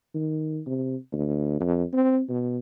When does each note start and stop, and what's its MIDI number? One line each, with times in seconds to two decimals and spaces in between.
0.15 0.61 51
0.66 0.96 48
1.13 1.59 38
1.60 1.84 41
1.93 2.22 60
2.29 2.58 47